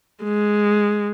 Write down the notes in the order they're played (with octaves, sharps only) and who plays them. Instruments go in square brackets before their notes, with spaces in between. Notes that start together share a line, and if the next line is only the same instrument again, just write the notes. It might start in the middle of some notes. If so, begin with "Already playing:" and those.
[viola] G#3